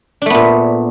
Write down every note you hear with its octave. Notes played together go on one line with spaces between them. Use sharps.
A#2 A3 B3 D4